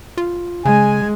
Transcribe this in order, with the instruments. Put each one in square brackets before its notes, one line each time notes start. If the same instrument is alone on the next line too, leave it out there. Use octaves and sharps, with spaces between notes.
[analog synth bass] F4
[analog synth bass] C#3 [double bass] G#3 [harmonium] G#5